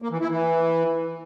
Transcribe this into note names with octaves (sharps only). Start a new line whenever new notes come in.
A#3
E3
E4
E3